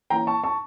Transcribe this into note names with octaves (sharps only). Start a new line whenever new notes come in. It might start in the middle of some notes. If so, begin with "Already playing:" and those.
E3 A#3 C#4 G5 A#5
A5 C#6
A5 C#6